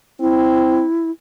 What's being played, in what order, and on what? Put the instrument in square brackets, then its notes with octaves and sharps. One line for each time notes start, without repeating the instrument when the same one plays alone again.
[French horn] C4 [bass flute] E4